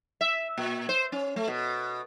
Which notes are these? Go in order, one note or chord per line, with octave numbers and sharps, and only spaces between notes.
E5
A#2
C5
C#4
A3
B2